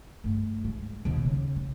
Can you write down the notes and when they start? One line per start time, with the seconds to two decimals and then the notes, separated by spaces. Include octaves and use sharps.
0.24 G2 A3
0.64 G#2
1.05 D#2 B2
1.26 C#3
1.56 E3